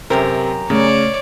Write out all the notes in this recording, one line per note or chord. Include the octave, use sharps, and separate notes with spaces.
F#2 C3 C4 G4 A#4
C#3 A3 C#5 D5